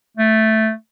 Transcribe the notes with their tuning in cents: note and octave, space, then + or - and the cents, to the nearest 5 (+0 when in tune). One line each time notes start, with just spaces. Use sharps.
A3 +0